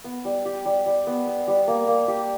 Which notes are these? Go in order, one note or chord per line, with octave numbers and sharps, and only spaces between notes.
B3
G3
G4
G3
G3
B3
B3
G3
A#3
A#3
G4